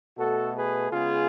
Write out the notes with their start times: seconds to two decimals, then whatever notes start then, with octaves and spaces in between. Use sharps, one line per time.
0.17 B2 A3 F#4 A4
0.55 G#4 B4
0.91 C#3 G#3 B3 F4 G#4